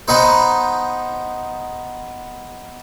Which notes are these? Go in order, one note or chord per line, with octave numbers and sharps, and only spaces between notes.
B3 D#4 C5